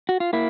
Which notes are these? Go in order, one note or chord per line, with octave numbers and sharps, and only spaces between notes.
F#4
F4
A#3 E4